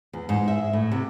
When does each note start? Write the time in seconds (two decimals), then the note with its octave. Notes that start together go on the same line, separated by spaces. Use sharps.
0.13 E2
0.29 G#2
0.48 E5
0.73 A2
0.91 C3